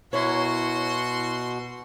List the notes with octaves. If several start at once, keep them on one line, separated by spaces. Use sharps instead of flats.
B2 E4 F#4 A#4 C#5 C6